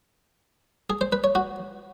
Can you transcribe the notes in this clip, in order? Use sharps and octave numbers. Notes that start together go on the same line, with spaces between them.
G#4
C5
B4
C#5
F#4